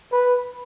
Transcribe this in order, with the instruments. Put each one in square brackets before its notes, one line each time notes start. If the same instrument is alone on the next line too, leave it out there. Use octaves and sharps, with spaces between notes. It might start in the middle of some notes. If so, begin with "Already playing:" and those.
[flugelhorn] B4